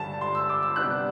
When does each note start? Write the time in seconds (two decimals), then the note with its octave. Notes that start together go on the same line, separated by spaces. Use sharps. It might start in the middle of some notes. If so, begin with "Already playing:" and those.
Already playing: G2 D3 G3 A5
0.21 C6
0.35 E6
0.49 D6
0.63 E6
0.76 C3 G3 B3 D4 F#6